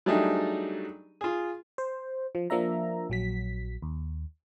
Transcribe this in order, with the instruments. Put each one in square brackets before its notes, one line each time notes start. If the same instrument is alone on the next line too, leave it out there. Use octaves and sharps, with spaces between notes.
[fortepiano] F#3 G3 A3 D4 D#4 G#4
F4 G#4
[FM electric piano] C5
F3
F3 A#3 D4 E5 A#5
A#1 F#3 B6
D#2